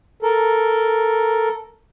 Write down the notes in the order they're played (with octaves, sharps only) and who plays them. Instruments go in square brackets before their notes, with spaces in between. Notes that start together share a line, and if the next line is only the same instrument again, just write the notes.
[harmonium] A4 A#4